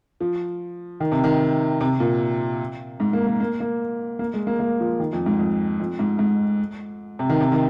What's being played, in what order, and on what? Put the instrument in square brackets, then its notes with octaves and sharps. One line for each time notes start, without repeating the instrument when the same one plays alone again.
[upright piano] F3
D#3
C3
D#3
C3
A#2
G#2
A#3
A#3
A#3
A#3
A#3
G#3
A#3
A#3
F3
D#3
F2
G#2
F2
F2
G#2
G#2
C3
D#3
C3
D#3